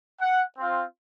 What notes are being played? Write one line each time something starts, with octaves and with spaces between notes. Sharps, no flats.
F#5
C4 F4